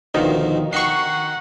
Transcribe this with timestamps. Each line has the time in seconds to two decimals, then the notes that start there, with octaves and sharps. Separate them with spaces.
0.14 D2 B2 D#3 F3
0.73 D#3 D#4 F#5 C#6 C7